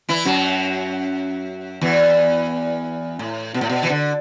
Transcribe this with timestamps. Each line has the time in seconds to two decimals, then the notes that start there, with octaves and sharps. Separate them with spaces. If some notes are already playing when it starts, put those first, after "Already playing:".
0.09 E3 E4
0.25 F#2 F#3
1.81 E2 E3
3.19 A2
3.54 B2
3.61 A2
3.69 B2
3.83 E3
3.89 D3